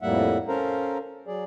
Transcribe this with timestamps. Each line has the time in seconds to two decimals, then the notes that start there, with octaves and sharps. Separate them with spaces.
0.02 F2 A2 G3 A#3 E5 F#5
0.48 C#4 A4 A#4 C5 F5 A#5
1.27 F#3 G#4 D5